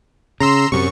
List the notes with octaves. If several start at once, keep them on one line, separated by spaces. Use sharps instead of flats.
C#3 A#5 C6 E6
F#2 C3 C#6